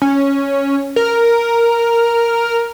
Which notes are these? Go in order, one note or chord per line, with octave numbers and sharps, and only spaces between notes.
C#4
A#4